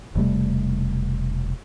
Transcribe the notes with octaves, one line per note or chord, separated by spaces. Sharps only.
E1 C3 G3 A3